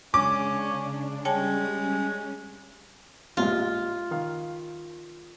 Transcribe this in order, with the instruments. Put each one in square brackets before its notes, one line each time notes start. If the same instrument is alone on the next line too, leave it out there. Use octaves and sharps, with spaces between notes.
[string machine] C#3 D4 [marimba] G#3 [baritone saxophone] C#4 [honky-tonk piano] D6
[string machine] G3 C#4 [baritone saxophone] G#3 [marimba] C#5 G5 A5
[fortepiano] A1 A#2 G#3 [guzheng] F4
[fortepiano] D#3 F5